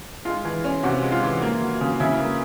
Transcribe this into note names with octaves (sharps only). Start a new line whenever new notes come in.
G#3 F4
E3
C#4
C3 F#4
G#3
F4
E3
A#3
F#3
C#3
C#3 E4
A#3